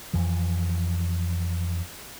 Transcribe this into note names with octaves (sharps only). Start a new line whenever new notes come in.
F2 E3 F3